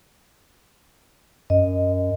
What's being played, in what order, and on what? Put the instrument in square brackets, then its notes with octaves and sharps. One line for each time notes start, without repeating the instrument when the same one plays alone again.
[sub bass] F#2 [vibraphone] D#5